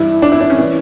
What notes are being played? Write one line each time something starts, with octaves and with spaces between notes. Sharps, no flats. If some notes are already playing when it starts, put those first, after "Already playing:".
Already playing: G2 E3 E4
D4
E4
D4
C#4
E3